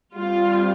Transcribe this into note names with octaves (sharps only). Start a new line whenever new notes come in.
G3 C4 F4